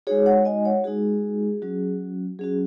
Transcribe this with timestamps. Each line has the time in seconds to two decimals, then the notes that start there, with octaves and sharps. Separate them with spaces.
0.07 G#3 D#4 F#4 G#4 C#5
0.26 C#5 F#5
0.45 D#5 G#5
0.65 C#5 F#5
0.84 G#3 D#4 F#4 G#4
1.62 F#3 C#4 F#4
2.39 F#3 C#4 F#4 G#4